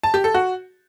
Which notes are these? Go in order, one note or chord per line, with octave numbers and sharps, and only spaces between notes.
A5
G4
A4
F#4